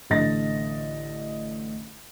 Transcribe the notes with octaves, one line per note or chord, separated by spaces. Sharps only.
A1 D3 D#5 A6 A#6